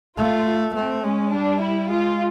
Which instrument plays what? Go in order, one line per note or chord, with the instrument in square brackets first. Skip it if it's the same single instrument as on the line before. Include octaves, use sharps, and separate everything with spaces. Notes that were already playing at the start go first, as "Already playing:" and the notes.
[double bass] A3 [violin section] F4
[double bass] A3 [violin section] C4
[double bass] G#3 [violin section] C#4
[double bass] G3 [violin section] D4
[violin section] E4
[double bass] G#3 [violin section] F4